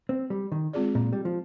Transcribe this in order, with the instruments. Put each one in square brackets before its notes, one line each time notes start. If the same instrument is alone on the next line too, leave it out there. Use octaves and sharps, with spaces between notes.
[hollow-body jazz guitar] C4
G3
D#3
[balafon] G#3 C4 F4 G#4 D5
[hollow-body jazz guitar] A#2
G3
F3